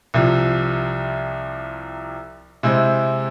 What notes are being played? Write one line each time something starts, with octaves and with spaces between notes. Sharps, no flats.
C2 C3 F3
C3 G#3 C4 E4